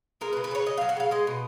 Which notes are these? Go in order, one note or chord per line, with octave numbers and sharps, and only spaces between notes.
G#3 A#4
B4
C#3
B4
C#3 C#5
C#3 D#5
F#3 F5
F#5
C#3 F5
G#3 D#5
B2